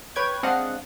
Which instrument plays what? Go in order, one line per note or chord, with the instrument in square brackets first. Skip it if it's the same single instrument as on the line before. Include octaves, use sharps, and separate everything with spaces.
[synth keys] B4 C#5 G5 G#6
G#3 C4 D4 D#5 F5 F#5